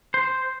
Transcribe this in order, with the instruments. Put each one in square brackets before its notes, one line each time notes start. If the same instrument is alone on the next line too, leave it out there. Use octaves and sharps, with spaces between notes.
[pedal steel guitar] C5